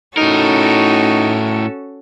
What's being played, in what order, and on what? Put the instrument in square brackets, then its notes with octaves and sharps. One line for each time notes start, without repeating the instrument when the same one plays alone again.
[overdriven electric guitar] A2 A#4 [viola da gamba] C#4 F#4 A4 [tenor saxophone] D#4